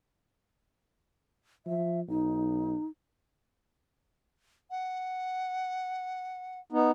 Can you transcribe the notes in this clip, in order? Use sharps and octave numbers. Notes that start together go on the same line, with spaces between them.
F3 E5
B1 D#4
F#5
B3 D#4